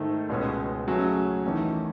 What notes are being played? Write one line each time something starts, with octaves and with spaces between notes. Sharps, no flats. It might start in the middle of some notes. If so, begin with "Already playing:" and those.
Already playing: G#2 D#3 A3
C#2 B2 G#3 C#4
C#3 F#3 A3 C#4 G#4
E2 D#3 A3 C#4